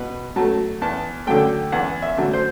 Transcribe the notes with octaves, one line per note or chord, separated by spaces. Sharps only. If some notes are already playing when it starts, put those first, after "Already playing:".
Already playing: B2 B4
F#3 A3 A5
E2 A5
D3 F#3 A3 G5
E2 F#5
E5
D3 F#3 A3
C5